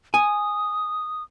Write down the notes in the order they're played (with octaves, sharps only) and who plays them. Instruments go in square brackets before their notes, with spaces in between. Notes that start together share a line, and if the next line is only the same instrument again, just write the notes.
[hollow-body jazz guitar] G#5 [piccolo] D#6